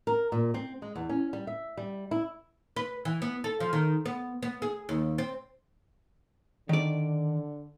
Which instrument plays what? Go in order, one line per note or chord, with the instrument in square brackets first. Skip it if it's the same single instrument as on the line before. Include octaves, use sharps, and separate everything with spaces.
[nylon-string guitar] A#4
A#2
C4
G#3
E2
C#4
G3
E5
G3
E4
[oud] B4
E3
B3
A4
F3
D#3
B3
B3
G#4
D#2
C4
[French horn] D3 [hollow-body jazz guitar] D#3 D5